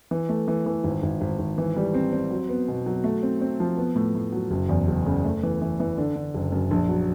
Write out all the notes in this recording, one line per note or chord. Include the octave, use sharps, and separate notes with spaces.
E3
A3
E3
E3
G#1
G#1
G#1
G#1
E3
G3
C4
C4
F#3
B3
B2
F#3
A3
C4
C4
F3
B3
A2
A2
F#3
F#1
E2
F#1
C#3
A3
E3
E3
E3
D3
D3
F#1
F#2
A#1
F#3